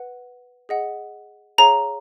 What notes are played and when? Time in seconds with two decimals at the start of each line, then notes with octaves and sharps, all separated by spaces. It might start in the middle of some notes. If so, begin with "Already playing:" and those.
Already playing: B4 F#5
0.69 G#4 D#5 F#5
1.58 G#4 C#5 F5 A#5